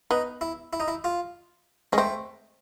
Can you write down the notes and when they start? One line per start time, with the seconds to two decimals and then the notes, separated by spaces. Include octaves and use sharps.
0.11 B3 D#4
0.41 E4
0.73 E4
0.80 D#4
0.88 E4
1.04 F4
1.93 G#3 C#4
1.98 A3 C4